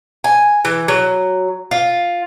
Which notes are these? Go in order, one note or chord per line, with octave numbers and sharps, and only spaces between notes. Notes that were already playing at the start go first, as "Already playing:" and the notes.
G#5
E3
F#3
F4